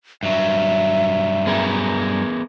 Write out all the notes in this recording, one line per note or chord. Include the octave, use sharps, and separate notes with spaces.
G2 F#3 E5
B3 G#4 A#4